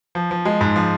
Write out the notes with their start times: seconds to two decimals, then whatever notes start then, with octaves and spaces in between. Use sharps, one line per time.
0.15 F3
0.31 F3
0.45 G#3
0.61 G#2
0.76 F3